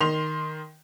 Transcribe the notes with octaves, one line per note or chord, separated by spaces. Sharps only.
D#3 C6 F7